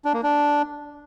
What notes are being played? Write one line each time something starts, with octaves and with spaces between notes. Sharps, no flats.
D4
A#3
D4